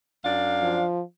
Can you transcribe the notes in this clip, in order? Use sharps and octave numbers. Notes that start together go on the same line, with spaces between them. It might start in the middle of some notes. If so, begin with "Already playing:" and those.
F#2 D4 F5
F3